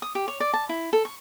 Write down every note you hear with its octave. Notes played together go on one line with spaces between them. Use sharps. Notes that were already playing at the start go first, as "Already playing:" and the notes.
D#6
G4
C#5
D5
A5
E4
A4
C#6